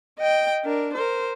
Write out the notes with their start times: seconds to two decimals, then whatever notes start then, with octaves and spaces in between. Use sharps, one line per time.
0.18 D#5 G5
0.64 D4 A#4
0.93 A#4 C5